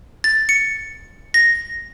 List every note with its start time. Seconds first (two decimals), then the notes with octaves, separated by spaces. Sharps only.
0.24 A6
0.49 C#7
1.34 A#6